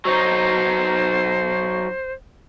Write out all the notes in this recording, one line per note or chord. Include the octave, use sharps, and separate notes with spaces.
F#3 D#4 C5